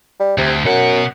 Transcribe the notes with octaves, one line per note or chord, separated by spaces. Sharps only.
G3
D2 C3
F#2 B2 F#5